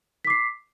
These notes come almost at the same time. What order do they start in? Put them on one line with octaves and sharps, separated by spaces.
B6 D6 C7